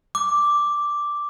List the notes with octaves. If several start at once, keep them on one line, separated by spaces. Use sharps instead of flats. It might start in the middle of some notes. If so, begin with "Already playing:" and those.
D6